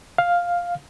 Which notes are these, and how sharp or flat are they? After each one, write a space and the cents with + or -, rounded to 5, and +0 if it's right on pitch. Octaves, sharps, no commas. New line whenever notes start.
F5 +5